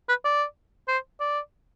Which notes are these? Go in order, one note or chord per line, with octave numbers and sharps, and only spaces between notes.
B4
D5
C5
D5